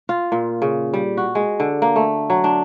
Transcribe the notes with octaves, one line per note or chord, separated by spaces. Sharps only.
F4
A#2
C#3
G3
F#4
G#3
D3
A#3
A3
F#3
D4